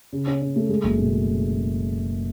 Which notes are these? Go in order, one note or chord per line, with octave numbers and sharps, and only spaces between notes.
C#3
C#4
C#4
A3
G#3
F#1
B2